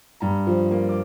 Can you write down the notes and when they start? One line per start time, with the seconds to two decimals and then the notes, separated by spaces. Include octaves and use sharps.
0.20 G2 A#5
0.47 F3
0.71 A#3
0.89 D6